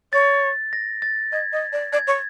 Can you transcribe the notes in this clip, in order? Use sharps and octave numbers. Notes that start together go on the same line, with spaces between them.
C#5 A6
A#6
A6
D#5 G#6
D#5
D5
D5 G#6
C#5